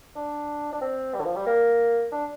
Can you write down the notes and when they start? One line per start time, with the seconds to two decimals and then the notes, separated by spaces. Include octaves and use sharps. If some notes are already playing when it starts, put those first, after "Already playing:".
0.16 D4
0.73 D4
0.81 C4
1.14 G3
1.20 D3
1.25 F3
1.36 G3
1.46 A#3
2.12 D4